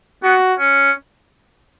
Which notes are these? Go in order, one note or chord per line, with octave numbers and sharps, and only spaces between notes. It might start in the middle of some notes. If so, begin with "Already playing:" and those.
B3 F#4
C#4